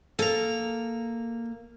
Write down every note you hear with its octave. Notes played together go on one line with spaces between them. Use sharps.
A#3 A4 A#5